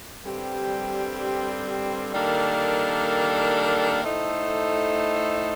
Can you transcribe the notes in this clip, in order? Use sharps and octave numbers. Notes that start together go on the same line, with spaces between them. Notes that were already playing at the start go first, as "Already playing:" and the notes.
G2 D3 G3 C4 G4
D#3 G3 A#3 D4 A4
A2 A3 D#4 A4 C5